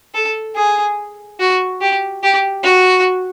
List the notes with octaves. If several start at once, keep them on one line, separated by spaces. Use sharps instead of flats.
A4
G#4
F#4
G4
G4
F#4